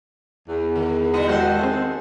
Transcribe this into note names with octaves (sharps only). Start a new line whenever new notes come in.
E2
D#3
G3 F#4 D#5
D#2 G#3 F#4 G4 A4 C5
C4 G#4 G#5